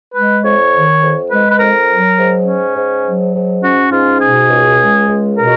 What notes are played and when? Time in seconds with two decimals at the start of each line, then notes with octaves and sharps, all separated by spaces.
0.15 G#3 B4
0.44 F2 C#5
0.73 D#3
1.02 F2
1.31 G#3 B4
1.51 B4
1.60 F2 A#4
1.89 F#3
2.18 G#2
2.47 C#4
2.76 G#2
3.05 F#3
3.34 G#2
3.63 C#4 F#4
3.92 G#2 F4
4.21 B2 G#4
4.50 C#2
4.79 G#3
5.08 C#2
5.37 B2 A#4